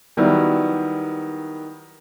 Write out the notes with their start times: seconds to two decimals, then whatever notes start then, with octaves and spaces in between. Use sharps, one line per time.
0.17 D#3 F#3 G3 B3 E4